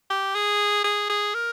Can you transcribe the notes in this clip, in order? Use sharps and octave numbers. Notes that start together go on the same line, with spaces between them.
G4
G#4
G#4
G#4
A#4